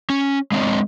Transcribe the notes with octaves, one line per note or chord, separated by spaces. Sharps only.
C#4
G#3 C4 D4 C#5 D#5